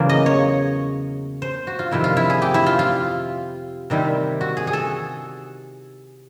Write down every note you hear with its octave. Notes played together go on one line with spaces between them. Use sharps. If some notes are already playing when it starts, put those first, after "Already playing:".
Already playing: E2 C#3 F#3 A#3
D#5
C#5
C5
F#4
F4
F2 C3 D#3 E4
F4
E4
G#4
G4
E4
F4
F4
C3 D#3 G3 C4 E4
F#4
G#4
G#4
A4